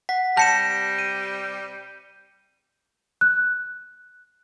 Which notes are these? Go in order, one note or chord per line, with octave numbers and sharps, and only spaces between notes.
F#5 B6
C3 G3 A5 G6 A#6 C#7 E7
D#7
F#6